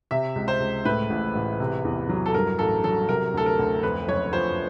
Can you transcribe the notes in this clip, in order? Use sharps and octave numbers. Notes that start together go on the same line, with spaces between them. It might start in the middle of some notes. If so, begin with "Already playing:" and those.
C3 E5
C#2
C5
C#2
A2 B4
A1
A1
C3
E2
F#3
A4
G2 A#4
A1 A4
F#3 A4
C3 A#4
D2 A4
A#4
D2
F2 B4
F#1 C#5
F3 C5